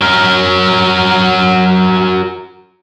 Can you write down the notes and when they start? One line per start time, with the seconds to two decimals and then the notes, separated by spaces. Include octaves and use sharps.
0.01 F#3 A#4